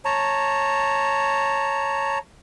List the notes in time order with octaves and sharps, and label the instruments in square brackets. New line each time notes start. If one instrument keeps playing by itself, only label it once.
[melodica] C#5 A5 A#5